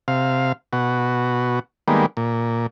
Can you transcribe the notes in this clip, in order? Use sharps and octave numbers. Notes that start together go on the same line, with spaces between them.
C3 F5
B2 F#4
D#3 G3 G#3 A#3 B3
A#2